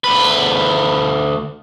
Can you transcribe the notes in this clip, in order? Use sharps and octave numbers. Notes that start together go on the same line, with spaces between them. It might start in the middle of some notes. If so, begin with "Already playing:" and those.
D2 B4